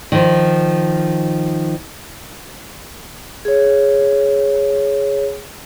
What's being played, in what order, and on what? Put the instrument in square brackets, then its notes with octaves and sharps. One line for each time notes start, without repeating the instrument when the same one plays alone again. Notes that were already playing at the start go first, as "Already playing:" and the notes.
[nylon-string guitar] D#3 F3
[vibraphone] G#4 C#5